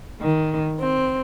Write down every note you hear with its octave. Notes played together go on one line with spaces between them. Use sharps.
D#3
C4